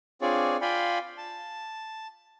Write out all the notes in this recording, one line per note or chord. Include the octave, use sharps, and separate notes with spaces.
C4 D4 F4 G#4 C#5 D5
F4 D5 F5 G5 G#5 B5
A5